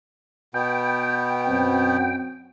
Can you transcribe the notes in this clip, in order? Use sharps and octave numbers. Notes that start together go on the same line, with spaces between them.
B2 B3 G5
F#2 F#3 C4